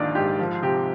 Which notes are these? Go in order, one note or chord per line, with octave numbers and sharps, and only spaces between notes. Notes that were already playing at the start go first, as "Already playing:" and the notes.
Already playing: A#1 G#2 D#3 A#3 D4 F4 D5
G#2 G4
F3
C3 G4